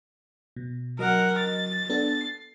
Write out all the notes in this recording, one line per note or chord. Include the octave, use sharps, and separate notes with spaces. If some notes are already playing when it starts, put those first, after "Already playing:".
B2
F#3 A#4 D#5 F#5
A6
B3 D4 A4
C7